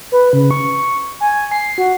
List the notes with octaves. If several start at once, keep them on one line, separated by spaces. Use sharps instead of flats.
B4
C#3
C#6
G#5
C7
F#4